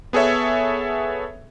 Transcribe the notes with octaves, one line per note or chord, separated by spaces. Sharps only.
B3 G#4 A4 C#5 E5